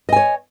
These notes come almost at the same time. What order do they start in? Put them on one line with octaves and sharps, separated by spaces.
D#5 G#5 C#5